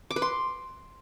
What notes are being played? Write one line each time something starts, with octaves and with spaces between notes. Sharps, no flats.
D6
B4
C6